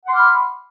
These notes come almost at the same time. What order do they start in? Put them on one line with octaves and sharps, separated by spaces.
F#5 C6 D6 F6 B5